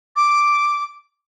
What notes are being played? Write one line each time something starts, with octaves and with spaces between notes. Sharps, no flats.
D6